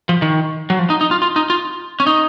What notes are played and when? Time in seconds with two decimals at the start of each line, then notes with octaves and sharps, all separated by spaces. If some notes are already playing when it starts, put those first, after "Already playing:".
0.09 F3
0.22 D#3
0.70 F#3
0.79 F3
0.90 D#4
1.01 D#4
1.11 F4
1.22 F4
1.36 D#4
1.50 F4
2.00 C#4
2.07 D#4